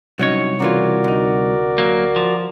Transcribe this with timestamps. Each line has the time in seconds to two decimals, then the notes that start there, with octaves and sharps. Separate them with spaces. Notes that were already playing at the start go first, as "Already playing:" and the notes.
0.19 C2 F#3 C#4 D#4 C#5
0.60 C#3 E3 F4 F#4 A#4 D5
1.04 D2 D#4
1.78 F#3 A#3
2.16 F3